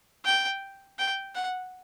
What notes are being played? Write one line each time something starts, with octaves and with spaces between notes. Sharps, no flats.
G5
G5
F#5